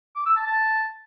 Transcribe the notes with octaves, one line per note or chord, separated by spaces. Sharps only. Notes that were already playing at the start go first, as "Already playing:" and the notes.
D6
E6
A5
A5